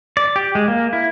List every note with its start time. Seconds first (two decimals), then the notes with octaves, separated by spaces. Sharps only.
0.17 D5
0.36 G4
0.55 G#3
0.68 A#3
0.93 E4